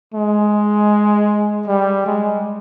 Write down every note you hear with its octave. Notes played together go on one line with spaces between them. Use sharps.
G#3
G3
G#3